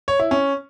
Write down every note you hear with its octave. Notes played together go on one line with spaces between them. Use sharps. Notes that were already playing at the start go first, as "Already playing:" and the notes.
C#5
E4
C#4